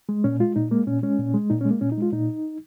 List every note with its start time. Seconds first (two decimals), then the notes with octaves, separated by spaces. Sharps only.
0.09 G#3
0.24 A#2 C#4
0.40 G#3 F4
0.56 A#2 D#4
0.71 G#3 A#3
0.87 A#2 C#4
1.03 G#3 C#4
1.18 A#2
1.34 G#3
1.50 A#2 D#4
1.61 C#4
1.65 G#3
1.71 A#3
1.81 A#2 C#4
1.92 D#4
1.97 G#3 F4
2.13 A#2 D#4